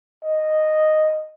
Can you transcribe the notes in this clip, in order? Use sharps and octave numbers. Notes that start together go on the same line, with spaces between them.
D#5